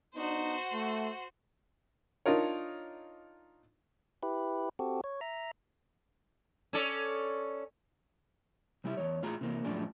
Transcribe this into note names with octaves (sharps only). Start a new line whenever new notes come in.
B3 D4 D#4 F#4 C5
A3
D4 D#4 F4 A#4 C#5
E4 G4 B4
C4 F#4 G4 A4
C#5
E5 A#5
C#4 A4 D5
C3 G3 E4 G4 E5
E2 C#5
A2 F4 G#4 A#5
C3 E3 A#3
F#2 A2 F3 D4 G#4